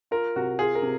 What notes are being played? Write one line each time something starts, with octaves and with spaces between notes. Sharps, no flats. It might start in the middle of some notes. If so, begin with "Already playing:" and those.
F4 A#4
C3 F#4
F4 G#4
A#4
C3